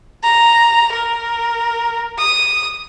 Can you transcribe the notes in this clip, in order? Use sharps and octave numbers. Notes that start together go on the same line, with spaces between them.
A#5
A#4
D#6